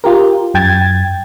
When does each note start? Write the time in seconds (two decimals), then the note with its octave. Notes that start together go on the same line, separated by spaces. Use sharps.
0.04 F4 G4 A#4
0.54 F#2 G5 G#6 A6